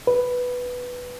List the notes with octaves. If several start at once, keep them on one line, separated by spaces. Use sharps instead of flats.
B4